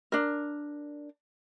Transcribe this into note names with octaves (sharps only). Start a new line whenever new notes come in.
D4 A#4